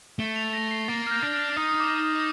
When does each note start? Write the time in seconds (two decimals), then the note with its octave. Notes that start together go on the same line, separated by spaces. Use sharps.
0.19 A3 G7
0.36 F7
0.53 A#6
0.71 C7
0.88 A#3 A6
1.07 F6
1.11 G6
1.22 D4
1.33 F6
1.56 D#4 D#6
1.69 D#6
1.80 D6
2.04 D#6